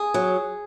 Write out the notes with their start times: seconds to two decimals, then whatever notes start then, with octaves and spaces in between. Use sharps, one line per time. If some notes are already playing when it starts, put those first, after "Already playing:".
Already playing: G#4
0.14 F#3